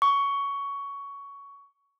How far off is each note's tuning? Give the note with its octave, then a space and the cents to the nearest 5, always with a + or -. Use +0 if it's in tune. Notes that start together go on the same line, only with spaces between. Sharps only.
C#6 +15